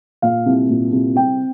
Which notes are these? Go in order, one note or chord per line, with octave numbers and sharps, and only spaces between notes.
A#2 F5
C2
A#2
C2
C4 G5